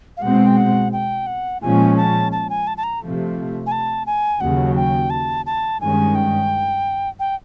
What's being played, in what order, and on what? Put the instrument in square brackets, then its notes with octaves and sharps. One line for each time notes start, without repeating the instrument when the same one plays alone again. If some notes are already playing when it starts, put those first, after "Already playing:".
[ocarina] F5
[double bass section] B2 G#3 C4 [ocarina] F#5
[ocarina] G5
F#5
G5
F#5
[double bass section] A#2 F3 G#3 C#4 [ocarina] G#5
[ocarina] A5
A5
G#5
A5
A5
A#5
[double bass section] C3 F3 A3
[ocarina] G#5
A5
G#5
[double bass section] D#2 C#3 F#3 [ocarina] F#5
[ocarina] G5
A5
A5
[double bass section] G2 D#3 G#3 C#4 [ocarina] G#5
[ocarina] G5
G5